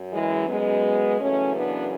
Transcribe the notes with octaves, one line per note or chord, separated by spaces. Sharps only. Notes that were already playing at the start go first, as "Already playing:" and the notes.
Already playing: F#2
E3 G#3
G#3 B3
F#2 C#3 E3 A3 C#4
B3 D4